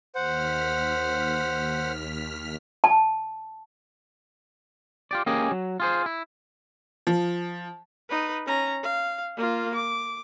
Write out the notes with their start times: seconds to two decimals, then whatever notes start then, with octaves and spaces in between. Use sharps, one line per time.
0.15 D#2 C5 F#5 F6 B6
2.84 A5
5.11 F4 G4 D5
5.26 A#3 C#4 G4 G#4 D#5
5.52 F#3
5.80 F4 G#4 C5
6.06 E4
7.07 F3
8.09 D#4 B4
8.46 C#4 A#5
8.83 F5
9.37 A#3 F4
9.75 D6